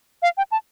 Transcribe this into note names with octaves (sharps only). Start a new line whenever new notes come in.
F5
G5
A5